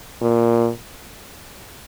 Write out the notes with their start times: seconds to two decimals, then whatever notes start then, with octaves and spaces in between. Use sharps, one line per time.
0.21 A#2